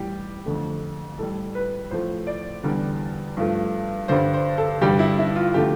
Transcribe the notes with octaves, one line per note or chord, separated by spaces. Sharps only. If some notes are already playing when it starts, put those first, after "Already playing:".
Already playing: A2 E3 G3 G4
F2 D3 A3
A2 G3 A4
B4
A2 F3 A3 C5
D5
E2 D3 G3
G2 F3 A3
G2 D3 G3 C5
C5
A4
G2 D3 G3 G4
E4
E4
F4
D3 F3 A3 G4